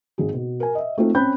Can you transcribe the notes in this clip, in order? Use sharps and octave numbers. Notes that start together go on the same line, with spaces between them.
G#1 G#4
B2
A#4 G#5
D#5 E5
A3 C4 D#4 F4 A4
C4 C#4 B5 F#6 G6